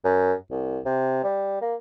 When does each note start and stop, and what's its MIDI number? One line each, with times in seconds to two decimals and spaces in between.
0.05 0.33 42
0.51 0.79 36
0.86 1.22 48
1.24 1.58 55
1.62 1.75 58